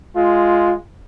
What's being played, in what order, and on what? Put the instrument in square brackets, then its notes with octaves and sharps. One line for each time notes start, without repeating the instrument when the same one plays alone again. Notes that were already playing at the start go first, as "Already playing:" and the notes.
[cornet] G#3 [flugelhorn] F4